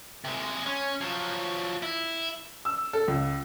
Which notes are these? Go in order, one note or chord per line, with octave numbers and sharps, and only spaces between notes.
C3 G#3
C#4
F3 F#3
E4
E6
A4
C#2